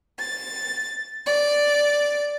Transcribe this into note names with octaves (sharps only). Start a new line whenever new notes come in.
A6
D5